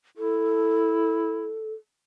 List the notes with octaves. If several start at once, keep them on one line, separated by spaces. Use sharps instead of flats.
E4 A4